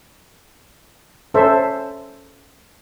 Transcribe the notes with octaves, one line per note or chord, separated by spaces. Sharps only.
C#4 A4 C5 E5